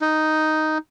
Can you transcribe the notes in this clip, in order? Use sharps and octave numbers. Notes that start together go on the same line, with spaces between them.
D#4